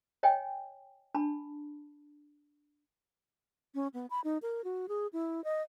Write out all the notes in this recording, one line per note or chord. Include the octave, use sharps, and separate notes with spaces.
C#5 D#5 G5 G#5
D4 A5 B5
C#4
B3
B5
D#4
A#4
F#4
G#4
E4
D#5